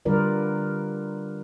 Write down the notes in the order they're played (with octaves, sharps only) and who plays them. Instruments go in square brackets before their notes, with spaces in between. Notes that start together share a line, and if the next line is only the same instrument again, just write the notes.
[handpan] D3 G3 F4 A#4 B4 D5